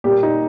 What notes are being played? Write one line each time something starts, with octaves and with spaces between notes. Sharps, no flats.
A#2 G3 A#3 G4
D#4